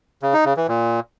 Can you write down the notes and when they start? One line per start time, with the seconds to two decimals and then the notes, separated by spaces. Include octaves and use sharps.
0.22 C#3
0.34 D#4
0.45 C#3
0.57 E3
0.68 A#2